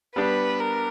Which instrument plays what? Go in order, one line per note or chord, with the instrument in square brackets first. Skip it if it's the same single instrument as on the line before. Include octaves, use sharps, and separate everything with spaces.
[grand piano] G3 B3 D4 G4 [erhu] B4
[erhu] A#4